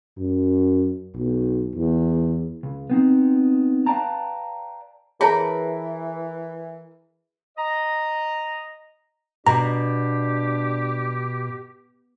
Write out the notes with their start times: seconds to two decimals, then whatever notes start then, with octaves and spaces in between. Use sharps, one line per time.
0.18 F#2
1.16 B1
1.76 E2
2.63 C#2
2.90 B3 C4 D#4
3.86 B4 D5 F5 G5 A5 A#5
5.21 E3 G#4 A#4 C#5 A5 B5
7.58 D#5 A#5
9.46 B2 D4 G4 A#5